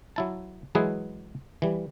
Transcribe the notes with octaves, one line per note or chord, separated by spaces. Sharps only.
F#3 E4 A5
E3 F#3 G#3 E4 G#4 B4
E3 G3